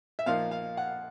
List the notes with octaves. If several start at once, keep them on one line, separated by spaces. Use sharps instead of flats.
E5
A#2 F3 A#3 D#4 F5
F5
F#5